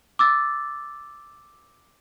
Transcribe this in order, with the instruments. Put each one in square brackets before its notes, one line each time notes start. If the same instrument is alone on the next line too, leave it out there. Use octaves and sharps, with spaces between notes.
[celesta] D6 E6 A6